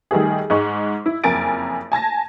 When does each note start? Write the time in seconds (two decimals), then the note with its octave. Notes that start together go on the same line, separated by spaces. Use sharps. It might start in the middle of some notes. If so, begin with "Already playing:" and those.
0.11 D#3 G3 A3 G#4
0.50 G#2 G#3 C#6
1.06 E4
1.24 F#1 F2 A#4 G#5 A6 D7
1.92 G#5 A5 G#6 A#6